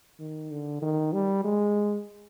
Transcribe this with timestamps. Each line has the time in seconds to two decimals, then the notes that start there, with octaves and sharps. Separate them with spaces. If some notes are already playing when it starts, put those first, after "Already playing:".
0.20 D#3
0.51 D3
0.82 D#3
1.13 G3
1.45 G#3